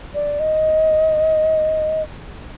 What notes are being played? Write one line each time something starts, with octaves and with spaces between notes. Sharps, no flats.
D5
D#5